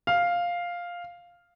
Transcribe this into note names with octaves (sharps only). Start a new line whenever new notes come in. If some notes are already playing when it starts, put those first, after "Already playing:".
F5